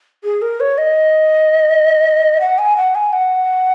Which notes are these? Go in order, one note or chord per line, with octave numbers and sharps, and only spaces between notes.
G#4
A#4
C#5
D#5
F#5
G#5
F#5
G#5
F#5